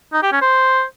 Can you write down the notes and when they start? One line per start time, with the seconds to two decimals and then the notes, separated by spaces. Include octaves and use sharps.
0.13 D#4
0.23 G4
0.32 C#4
0.42 C5